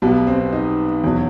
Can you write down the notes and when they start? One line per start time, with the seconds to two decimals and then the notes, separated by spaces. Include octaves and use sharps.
0.02 B1 B2 G3 B3
0.27 C4
0.53 D#4
1.04 E2 B2 F#3